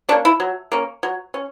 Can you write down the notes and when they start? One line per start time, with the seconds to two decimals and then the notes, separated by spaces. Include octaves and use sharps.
0.09 C#4 D4
0.12 A#3
0.25 E4
0.40 F#3
0.72 A#3 C#4
1.03 F#3
1.34 C#4